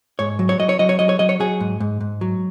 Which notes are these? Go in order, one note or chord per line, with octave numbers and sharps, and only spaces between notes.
G#2 C#5
F#3
C#5
F#3 D#5
C#5
F#3 D#5
C#5
F#3 D#5
C#5
F#3 D#5
C#5
F#3 G#4
G#2
G#2
G#2
F#3